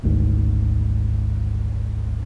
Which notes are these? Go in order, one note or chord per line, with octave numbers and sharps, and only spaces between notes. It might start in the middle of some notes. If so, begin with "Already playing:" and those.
G#1 D2 G#2